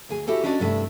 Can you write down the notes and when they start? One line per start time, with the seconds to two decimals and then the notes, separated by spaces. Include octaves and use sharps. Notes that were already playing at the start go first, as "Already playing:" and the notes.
0.09 D2 G#4 G#5
0.27 E4 F#4 G4 A4
0.43 C#4 D4 E4 F#4 D5 D#5
0.60 G2 C3 A3 D4 E4